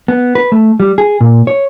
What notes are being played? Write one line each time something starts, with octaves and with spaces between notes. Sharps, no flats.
B3
B4
A3
G3
G#4
A#2
C#5